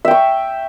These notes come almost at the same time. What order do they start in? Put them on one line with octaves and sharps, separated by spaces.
E5 G5 C#6